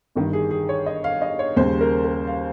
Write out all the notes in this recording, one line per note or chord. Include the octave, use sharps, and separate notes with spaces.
G1 G2 D#3
G#4
G#4
C#5
D#5
F5
D#5
C#5
D#2 C#3 G3 C5
A#4
A#4
F5